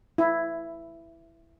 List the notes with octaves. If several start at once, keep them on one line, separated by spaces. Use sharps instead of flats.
E4